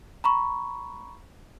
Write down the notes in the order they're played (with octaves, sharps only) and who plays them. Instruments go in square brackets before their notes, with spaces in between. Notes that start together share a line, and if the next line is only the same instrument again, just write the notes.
[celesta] A#5 B5 C#6